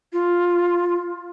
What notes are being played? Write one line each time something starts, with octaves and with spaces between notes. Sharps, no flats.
F4